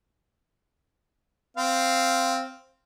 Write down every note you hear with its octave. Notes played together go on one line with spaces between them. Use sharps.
C4 F5